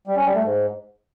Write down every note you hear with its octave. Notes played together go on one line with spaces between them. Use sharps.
G3
C#4
G3
A3
G#2